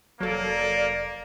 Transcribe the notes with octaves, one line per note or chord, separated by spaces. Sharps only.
F1 F#3 A#3 A4 D5